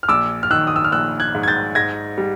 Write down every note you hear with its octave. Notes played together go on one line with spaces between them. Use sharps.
F6
A#1 D6 E6
F6
D#3 E6 F#6
D#6
E6
F6
A#1 E6 F#6
F#6 G#6
G#2
G#6
G6 A6
G#2 G#6 A#6
G3